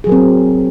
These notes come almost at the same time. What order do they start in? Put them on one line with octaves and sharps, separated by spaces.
G#4 F#3 A#4 C4